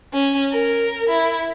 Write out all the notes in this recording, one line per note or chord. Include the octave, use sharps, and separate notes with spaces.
C#4
A#4
E4